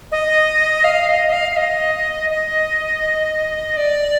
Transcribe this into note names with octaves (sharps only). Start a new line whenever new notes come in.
D#5
F5
D#5
D#5
F5
F5
D#5
D#5
D5